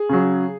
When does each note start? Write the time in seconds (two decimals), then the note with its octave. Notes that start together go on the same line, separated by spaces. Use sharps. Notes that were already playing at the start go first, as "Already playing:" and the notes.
Already playing: G#4
0.09 C#3 F#3